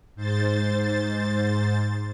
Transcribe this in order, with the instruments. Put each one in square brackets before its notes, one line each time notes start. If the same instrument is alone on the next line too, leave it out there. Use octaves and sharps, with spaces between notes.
[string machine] G#2 C5 A6